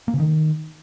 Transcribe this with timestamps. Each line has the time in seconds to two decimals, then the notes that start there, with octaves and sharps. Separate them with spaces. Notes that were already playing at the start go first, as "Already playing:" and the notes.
0.08 A#3
0.14 C#3
0.20 D#3